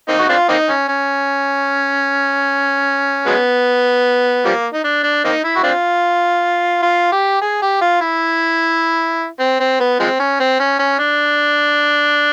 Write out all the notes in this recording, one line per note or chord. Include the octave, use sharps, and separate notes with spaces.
A#3 C4 D#4
F#4
C4 D4 F4
A#3 C4 D#4
C#4
C#4
F#3 G#3 B3
F3 G3 A#3
D#4
D4
D4
A#3 C4 D#4
E4
F#4
C4 D4 F4
F4
G4
G#4
G4
F4
E4
C4
C4
B3
F3 G#3 C4
C#4
C4
C#4
C#4
D4